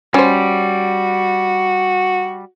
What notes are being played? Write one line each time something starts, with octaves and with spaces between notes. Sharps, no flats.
G3 C#4 F#4 C5